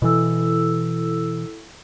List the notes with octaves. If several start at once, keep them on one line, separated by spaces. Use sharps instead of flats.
B2 E3 E4 A4 E6